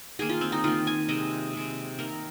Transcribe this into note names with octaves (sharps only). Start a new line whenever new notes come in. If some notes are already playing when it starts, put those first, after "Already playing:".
D#3 A#3 G#4
F4
C4
D#4
D#3 A#3 F4
G#5
C3 G#3 D#5
C3 G#3
D#3 A#3 A#4